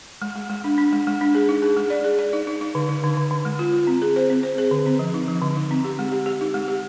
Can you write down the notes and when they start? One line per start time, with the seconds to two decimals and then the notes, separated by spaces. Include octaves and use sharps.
0.22 G#3
0.36 G#3
0.50 G#3
0.64 D4
0.78 D4
0.93 G#3
1.07 G#3
1.21 D4
1.35 G#4
1.49 D#4
1.62 G#4
1.77 G#3
1.90 D5
2.04 G#4
2.19 D5
2.33 D#4
2.47 D#4
2.61 D#4
2.75 D3
2.89 D#4
3.04 D3
3.18 D3
3.31 D3
3.45 G#3
3.59 F4
3.73 F4
3.87 C4
4.02 G#4
4.16 C5
4.30 C4
4.43 C5
4.58 G#4
4.71 D3
4.86 C4
4.99 F3
5.14 D#4
5.28 F3
5.42 D3
5.56 D#4
5.71 C4
5.84 G4
5.99 G#3
6.12 G4
6.26 G4
6.41 D#4
6.54 G#3
6.68 G4